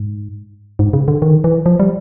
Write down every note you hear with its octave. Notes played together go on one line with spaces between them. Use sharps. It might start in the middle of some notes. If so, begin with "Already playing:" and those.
Already playing: G#2
G#2
C#3
D3
D#3
E3
F3
G3